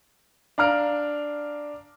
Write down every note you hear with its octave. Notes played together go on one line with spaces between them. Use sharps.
D4 F5 A#5 F6 D7